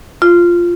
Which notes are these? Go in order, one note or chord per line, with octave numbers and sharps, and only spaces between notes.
F4